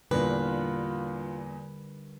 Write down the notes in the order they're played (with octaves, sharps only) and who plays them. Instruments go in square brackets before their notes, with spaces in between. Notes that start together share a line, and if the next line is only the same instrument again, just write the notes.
[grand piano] E2 A#2 D4 [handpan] D3 G3 A#4 [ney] F4 [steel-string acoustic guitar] B4